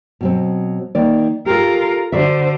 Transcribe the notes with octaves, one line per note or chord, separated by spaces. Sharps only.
B2 F#3 C4
D#3 A#3 D5
F4 G4 A4 A#4
D3 F#4 C5 D5 E5